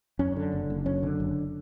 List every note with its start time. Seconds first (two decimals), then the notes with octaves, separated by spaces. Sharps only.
0.19 F#2 C#4
0.36 D3
0.53 F#1
0.70 F#1
0.86 F#2 C#4
1.03 D3
1.20 F#1